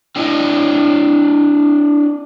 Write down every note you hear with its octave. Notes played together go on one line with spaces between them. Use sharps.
C4 D4 E4 D#5